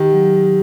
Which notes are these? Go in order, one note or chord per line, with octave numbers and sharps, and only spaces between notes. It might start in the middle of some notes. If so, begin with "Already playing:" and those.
Already playing: D#3 G4
F#3
F#3